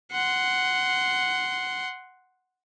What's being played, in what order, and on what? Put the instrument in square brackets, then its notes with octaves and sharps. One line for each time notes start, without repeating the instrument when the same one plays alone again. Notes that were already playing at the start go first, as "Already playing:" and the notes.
[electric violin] F#5 C6